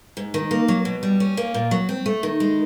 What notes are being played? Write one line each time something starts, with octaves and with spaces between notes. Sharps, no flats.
G#2
D#3
A#3
F#3
B2
G3
C#4
A#3
A#2
F#3
C4
A3
D#3
G#3